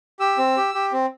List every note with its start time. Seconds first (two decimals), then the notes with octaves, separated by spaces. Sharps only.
0.20 G4 E6
0.38 C4
0.57 G4
0.74 G4
0.92 C4